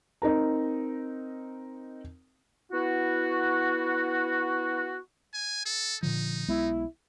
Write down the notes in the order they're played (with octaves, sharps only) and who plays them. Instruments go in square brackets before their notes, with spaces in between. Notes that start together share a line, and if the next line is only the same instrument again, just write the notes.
[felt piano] C4 D#4 A#4 A#5
[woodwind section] B3 E4 F#4
[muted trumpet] G#5
A4
[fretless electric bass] A#2 D3 F3 [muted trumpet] D#4
[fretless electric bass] B1 G#3 B3 [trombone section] E4